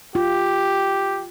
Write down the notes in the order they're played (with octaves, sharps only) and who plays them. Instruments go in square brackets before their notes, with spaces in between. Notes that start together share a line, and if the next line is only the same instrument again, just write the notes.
[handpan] F4 [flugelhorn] G4